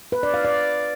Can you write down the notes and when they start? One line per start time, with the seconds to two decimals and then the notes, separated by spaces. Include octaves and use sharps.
0.12 B4
0.23 D5
0.34 F5
0.45 D5